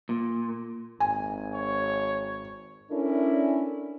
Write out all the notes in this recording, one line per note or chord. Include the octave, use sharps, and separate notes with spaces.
A#2
G#1 G#5
C#5
C#4 D4 E4 A4 A#4 D5